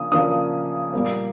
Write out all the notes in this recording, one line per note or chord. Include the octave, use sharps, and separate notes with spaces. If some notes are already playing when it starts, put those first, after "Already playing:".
Already playing: C#3 F3 A#3 D4 D#6
C#3 F3 A#3 D4 D#6
A#2 G3 A#3